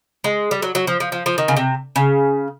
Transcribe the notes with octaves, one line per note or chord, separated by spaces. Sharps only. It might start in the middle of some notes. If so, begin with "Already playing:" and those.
G#3
G3
F#3
F#3
F3
F3
F3
F3
D#3
C#3
C3
C#3